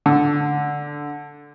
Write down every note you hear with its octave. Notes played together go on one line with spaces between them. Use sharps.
D3